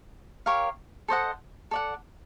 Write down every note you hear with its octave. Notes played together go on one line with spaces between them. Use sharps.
G4 A#4 C#5 F5
A4 C5 D#5 F#5
A4 D5 F#5